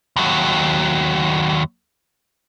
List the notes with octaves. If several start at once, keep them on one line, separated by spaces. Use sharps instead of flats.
D#2 F#3